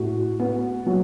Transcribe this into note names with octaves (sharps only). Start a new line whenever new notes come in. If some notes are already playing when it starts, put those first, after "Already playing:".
Already playing: A2 F#4
B3
F#3